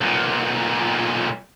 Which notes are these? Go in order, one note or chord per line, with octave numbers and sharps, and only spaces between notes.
B1 A#2